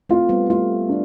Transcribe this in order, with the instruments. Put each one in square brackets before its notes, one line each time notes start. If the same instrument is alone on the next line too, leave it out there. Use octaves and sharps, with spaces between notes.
[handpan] A3 C4 [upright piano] F4
[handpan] G3 B3
[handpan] A3 [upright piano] F4
[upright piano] D4